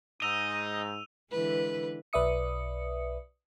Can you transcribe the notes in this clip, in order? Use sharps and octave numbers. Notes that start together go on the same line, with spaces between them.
G#2 D#4 D#5 E6 D#7 F7
D3 E3 G#3 B4
B1 B4 D5 E5 D#6 C#7